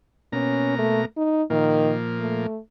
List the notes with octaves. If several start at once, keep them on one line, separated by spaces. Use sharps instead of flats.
B2 A#3 C#4 A#5
A3
D#4
A#2 D#3 F3 A#3
A3